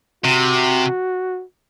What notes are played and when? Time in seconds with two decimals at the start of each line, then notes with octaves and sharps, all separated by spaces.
0.24 C3 F#4